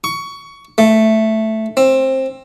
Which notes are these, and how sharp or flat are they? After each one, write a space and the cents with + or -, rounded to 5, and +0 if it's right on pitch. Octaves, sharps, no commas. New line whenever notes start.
C#6 +15
A3 +0
C4 +20